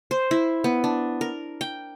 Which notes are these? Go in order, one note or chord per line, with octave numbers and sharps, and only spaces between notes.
C5
E4
B3
D4
A#4
G5